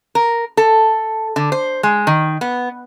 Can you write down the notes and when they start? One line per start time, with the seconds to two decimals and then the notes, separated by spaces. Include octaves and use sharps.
0.15 A#4
0.57 A4
1.36 D3
1.52 C5
1.83 G#3
2.07 D#3
2.41 B3